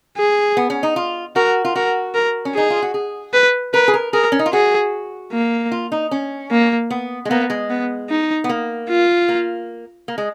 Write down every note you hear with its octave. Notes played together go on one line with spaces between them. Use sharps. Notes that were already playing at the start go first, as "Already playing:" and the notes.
G#4
B3
C#4
D#4
F4
F#4 A#4
F4
F#4 A#4
A#4
C#4
D#4 G#4
F4
F#4
G#4
B4
A#4 B4
G#4
A#4
G#4 A#4
C#4
D#4
F4
F#4 G#4
A#3
F4
D#4
C#4
A#3
B3
G#3
A#3 B3
G#3
B3
D#4
B3
A#3
F4
A#3
A#3
G#3